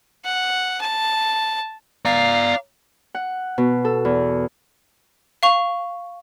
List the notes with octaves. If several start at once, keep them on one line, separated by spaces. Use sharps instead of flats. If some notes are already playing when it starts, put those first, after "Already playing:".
F#5
A5
D5 F5 A#5
F#5
B2
A4
E2
F5 C#6 F7